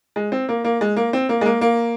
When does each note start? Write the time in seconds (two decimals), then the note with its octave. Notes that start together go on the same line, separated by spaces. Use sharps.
0.16 G#3
0.32 C4
0.49 A#3
0.65 A#3
0.81 G#3
0.97 A#3
1.13 C4
1.29 A#3
1.41 G#3
1.46 A#3
1.61 A#3